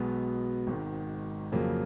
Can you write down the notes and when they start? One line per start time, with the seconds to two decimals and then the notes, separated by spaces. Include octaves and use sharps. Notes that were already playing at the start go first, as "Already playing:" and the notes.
Already playing: B1 B2 G#3 B3
0.67 G#1 G#2 D#3
1.52 F2 C#3 F#3 A#3